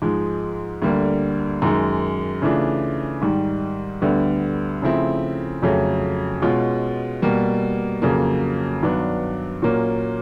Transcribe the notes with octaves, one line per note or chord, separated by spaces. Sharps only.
G#2 F3 G#3
D2 D3 G3 A#3
F#2 D#3 G#3
C#3 E3 A3 D4 F4
G#2 D#3 G3
D2 D3 G3 B3
C#3 F3 A3 C4 E4
F2 C#3 F#3 A3 C#4
B2 G#3 C#4 F4
B2 G3 A#3
F2 C#3 F#3 A#3
G2 D#3 F#3 B3 D4
A#2 F#3 A#3 C#4